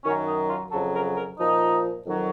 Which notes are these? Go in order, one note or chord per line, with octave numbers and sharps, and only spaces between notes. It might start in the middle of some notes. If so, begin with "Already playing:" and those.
F#2 D#3 F#3 C#4
D#4
F4
F2 C#3 F#3 A4
A#4
A#4
A#2 F3 D#4
F2 D#3 F#3